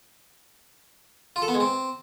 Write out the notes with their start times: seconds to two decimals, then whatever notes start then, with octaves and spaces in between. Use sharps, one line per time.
1.36 F4
1.42 A4
1.48 B3
1.54 G#3
1.60 C4